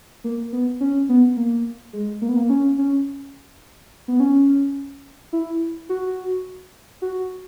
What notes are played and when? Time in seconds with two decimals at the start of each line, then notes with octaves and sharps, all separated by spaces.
0.24 A#3
0.53 B3
0.80 C#4
1.09 B3
1.37 A#3
1.93 G#3
2.22 A#3
2.29 B3
2.36 A#3
2.49 C#4
2.78 C#4
4.08 B3
4.20 C#4
5.33 E4
5.89 F#4
7.02 F#4